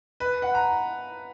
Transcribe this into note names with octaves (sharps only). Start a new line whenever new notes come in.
B4
F#5
A#5